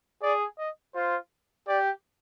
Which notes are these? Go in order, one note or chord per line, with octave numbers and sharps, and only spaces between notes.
G#4 D5
D#5
F4 C5
G4 D5